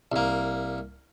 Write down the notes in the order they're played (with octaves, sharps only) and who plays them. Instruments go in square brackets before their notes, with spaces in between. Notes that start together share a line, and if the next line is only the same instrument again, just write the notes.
[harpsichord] C2 A#3